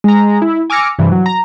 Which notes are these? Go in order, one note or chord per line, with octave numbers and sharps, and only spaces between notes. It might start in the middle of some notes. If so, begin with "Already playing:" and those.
G#3 A#5
E4
G#5 D6 E6 F6 A#6 C#7
G2 C3 E3
F#3
A#5